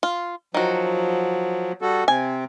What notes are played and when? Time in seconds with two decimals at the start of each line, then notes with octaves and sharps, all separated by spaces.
0.03 F4
0.54 D#3 F3 F#3 F#4
1.82 G3 F#4 A4
2.08 C3 C4 G#5